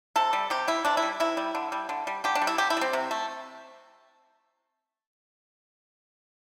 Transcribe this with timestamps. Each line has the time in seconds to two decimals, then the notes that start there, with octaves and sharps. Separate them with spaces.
0.16 C3 A4
0.33 G3
0.50 C3 G4
0.68 G3 E4
0.85 C3 D4
0.97 E4
1.03 G3
1.20 C3 E4
1.37 G3
1.55 D3
1.72 G3
1.89 D3
2.07 G3
2.24 D3 G4
2.35 D4
2.42 G3
2.47 E4
2.58 D3 G4
2.70 E4
2.77 G3 C4
2.93 C3
3.11 A3